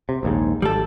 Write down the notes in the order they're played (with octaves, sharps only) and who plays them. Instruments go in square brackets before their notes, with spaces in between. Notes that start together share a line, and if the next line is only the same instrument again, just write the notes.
[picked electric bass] C3
A#1 D#2 G#2
[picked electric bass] G#1 [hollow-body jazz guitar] G3 A4